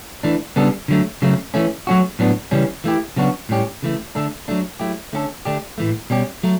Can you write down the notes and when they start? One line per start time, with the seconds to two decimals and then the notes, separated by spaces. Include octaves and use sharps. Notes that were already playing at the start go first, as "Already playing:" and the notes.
0.23 E3 A3 D4
0.56 C#3 G3 B3 D4 A4
0.88 D3 F#3 A3
1.22 C#3 F#3 A3
1.54 E3 A3 C#4
1.87 F#3 A3 C#4 F#4
2.19 A2 F#3 B3 D4
2.51 C#3 E3 G3 C#4
2.84 E3 A3 E4 G4
3.16 C#3 F#3 B3 D4 F#4
3.49 A2 G3 C#4 G4
3.83 C#3 E3 A3
4.15 D3 A3 D4 A4
4.48 F#3 A3 D4
4.79 F#3 A3 E4 G4
5.13 D3 A3 C#4 F#4 A4
5.45 D3 A3 D4 G4
5.78 A2 E3 A3
6.10 B2 G3 C#4 G4
6.43 F#3 A3